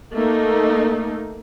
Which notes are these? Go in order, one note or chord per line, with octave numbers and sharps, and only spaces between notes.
A3 A#3 D#4